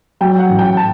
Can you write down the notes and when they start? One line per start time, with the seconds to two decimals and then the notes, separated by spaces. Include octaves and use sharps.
0.21 F#3 G5
0.39 F#5
0.49 A1
0.59 G5
0.77 A5